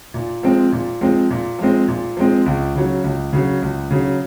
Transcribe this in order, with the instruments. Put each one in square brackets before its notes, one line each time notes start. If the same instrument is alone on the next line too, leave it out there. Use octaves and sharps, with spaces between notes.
[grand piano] A#2
F3 G#3 C4
A#2
F3 G#3 C4
A#2
F3 G#3 C4
A#2
F3 G#3 C4
C#2
C#3 F#3
C#2
C#3 F#3
C#2
C#3 F#3